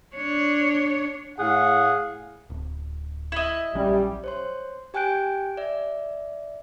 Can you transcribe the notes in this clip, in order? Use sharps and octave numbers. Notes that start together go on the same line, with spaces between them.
D4 C#5
A2 E4 G#4 F5 F#5
D1
E4 D#5
A#1 F#3 G3 C#4
C5 C#5 C6
G4 G5 G#5 F#6 G6 D7
D5 E5